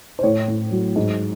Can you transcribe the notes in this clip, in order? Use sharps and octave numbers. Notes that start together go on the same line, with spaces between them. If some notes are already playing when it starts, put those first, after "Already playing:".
C5
A2 C#5
A2
F#3
G#2